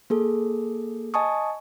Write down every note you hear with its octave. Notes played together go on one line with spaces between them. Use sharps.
A#3 G#4 A4
D#5 G#5 A5 C#6 D#6